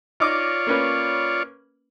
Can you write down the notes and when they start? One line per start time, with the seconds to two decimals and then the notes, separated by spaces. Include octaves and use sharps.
0.20 D#4 F4 C#5 D5 D6
0.67 A#3 C#4 B4